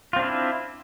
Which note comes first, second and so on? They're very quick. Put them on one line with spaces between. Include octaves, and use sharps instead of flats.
F4 C4 D4 E4